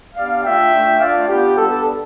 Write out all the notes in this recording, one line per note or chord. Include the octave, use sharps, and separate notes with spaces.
B3 D4 G4 D5 F5
A3 D4 F4 E5 G5
A3 D4 F4
A3 D4 F4 D5 F5
B3 D4 F4 G4
G3 B3 D4 G4 A4